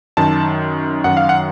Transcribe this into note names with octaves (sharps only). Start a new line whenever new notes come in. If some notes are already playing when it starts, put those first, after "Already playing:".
F#2 D#3 A5
F#2 D#3 F#5
F5
F#5